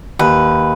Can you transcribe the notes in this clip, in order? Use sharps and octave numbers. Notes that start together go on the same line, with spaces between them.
D#2 B4